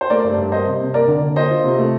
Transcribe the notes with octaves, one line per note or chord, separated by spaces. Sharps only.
C5
A3 A#4 D5
G2
G2
A#3 C5 D#5
C3
C3
A#3 A#4 D5
D3
D3
A#3 C5 D#5
F4
C3
A3